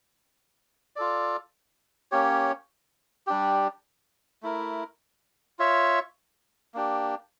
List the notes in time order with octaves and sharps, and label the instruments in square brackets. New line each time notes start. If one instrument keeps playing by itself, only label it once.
[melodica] F4 A4 D5
A#3 C#4 G4 C#5
G3 D4 G4
A3 E4 A#4
F4 C#5 E5
A#3 D4 G4